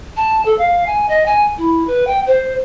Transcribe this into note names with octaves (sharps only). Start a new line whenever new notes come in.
A5
A4
F5
G#5
D#5
G#5
E4
B4
G5
C5